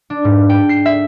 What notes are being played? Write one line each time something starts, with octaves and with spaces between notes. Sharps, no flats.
D4
G#2
G5
C7
E5